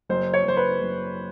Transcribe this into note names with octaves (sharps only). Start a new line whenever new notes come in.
F#1 C5
C#5
F#1 C5
B4
F#1